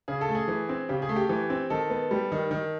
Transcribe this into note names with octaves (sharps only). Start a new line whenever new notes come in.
C#3 G#4
A4
A3
G#4
E3
C4
C#3 G4
G#4
A3
G4
E3
C4
D#3 A4
B3
G3
D#3
D#3